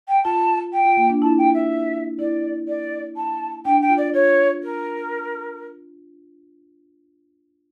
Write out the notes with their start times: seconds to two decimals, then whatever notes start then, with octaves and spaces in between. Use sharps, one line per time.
0.08 G5
0.24 F4 A5
0.73 G5
0.85 F4
0.97 A#3
1.10 D4
1.22 E4 A5
1.38 G5
1.54 E5
2.19 E4 D5
2.68 D5
3.16 A5
3.65 D4 G5
3.82 G5
3.89 F4
3.97 D5
4.14 F4 C#5
4.63 A#4